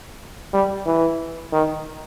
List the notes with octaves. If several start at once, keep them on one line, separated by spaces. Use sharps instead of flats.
G3
E3
D#3